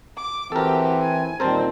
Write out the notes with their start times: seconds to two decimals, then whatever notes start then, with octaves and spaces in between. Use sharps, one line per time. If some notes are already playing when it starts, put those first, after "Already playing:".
0.18 D6
0.52 E3 C4 F#4 G4 A4 A#4
1.01 G#5
1.40 A#2 D#3 G3 C4 A#4 C5 A5